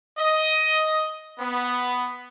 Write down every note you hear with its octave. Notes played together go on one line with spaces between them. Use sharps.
D#5
B3